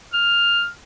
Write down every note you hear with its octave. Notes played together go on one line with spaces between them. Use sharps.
F6